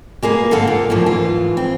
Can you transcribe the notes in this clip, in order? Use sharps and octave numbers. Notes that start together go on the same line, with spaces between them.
G#3 A#3 G#4 B4
G#2 D3 A4 F5 F#5
A#2
F#2 A2 C#3 E3 F3 A#3
G#2 E3 F4
C4